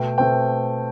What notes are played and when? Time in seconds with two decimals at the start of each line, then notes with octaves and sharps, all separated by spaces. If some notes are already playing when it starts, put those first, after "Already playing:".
Already playing: B2 A3 G5
0.18 B2 A3 C4 G5